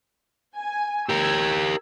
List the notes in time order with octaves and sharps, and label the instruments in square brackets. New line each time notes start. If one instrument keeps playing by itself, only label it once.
[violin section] G#5
[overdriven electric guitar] G4 A#4 [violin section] E6 G#6